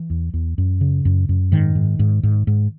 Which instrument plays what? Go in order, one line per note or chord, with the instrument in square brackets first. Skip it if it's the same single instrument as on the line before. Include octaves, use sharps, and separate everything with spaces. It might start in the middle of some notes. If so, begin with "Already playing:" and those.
Already playing: [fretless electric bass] E3
E2
E2
F#2
C#3
F#2
F#2
G#2 D#3
G#2
G#2
G#2
G#2